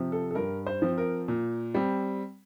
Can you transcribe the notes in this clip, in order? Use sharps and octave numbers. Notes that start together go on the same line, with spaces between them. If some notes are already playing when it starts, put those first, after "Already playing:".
Already playing: C3 F3 C4
A4
A4
G2 A#4
C5
F3 C4
A#4
A#2
G3 C4